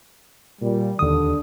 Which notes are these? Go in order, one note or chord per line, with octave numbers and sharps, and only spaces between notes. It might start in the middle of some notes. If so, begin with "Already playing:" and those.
A#2 G3
D#2 D3 D#6